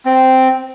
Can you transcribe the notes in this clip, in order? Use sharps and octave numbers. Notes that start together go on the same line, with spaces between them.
C4